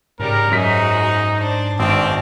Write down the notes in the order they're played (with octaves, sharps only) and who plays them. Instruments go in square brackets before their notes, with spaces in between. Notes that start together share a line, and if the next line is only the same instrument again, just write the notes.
[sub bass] G#2 [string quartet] C#3 G3 [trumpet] A#4
[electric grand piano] F#2 B6 [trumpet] D#4 [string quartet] F#4 G#4 C5
[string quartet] D4 C5
[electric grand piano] G#1 [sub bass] G2 [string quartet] B2 D4 D6 [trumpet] C4